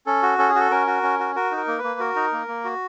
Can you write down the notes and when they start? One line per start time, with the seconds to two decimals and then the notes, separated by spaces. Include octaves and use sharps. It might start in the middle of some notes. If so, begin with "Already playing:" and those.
0.07 C#4 A4
0.23 F#4
0.39 C#4 A4
0.49 G#4
0.55 F#4 A4
0.71 C#4 A#4
0.87 F#4
1.03 C#4
1.19 F#4
1.35 F#4 A#4
1.51 D#4
1.57 A#4
1.68 A#3
1.78 B4
1.84 A#3
2.00 F#4 A#4
2.16 D#4
2.32 A#3
2.48 A#3
2.64 F#4